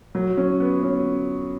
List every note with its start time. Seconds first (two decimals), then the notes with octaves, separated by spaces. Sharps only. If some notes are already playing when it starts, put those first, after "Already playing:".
0.15 F#3
0.37 C#4
0.60 B3
0.83 C#4